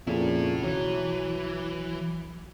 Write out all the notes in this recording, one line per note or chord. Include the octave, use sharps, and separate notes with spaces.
F2 A#2 C#3 E4 A4
B1 E3 F#3